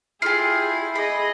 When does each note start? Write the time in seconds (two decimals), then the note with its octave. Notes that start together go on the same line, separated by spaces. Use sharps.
0.22 E4 F4 G4 G#4 C7
0.95 G#4 D#5 B5